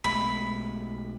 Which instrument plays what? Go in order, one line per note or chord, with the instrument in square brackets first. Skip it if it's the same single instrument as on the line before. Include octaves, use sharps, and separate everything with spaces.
[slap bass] B1 G#3 A3 [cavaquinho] B5